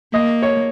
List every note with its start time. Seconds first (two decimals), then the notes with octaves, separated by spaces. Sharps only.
0.13 A#3 D#5
0.43 C#5